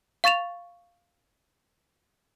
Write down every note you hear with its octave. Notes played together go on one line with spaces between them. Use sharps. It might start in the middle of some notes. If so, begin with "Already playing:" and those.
F5 C#6 A6 E7 F7